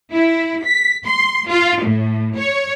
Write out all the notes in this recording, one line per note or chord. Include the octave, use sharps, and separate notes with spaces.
E4
B6
C6
F4
A2
C#5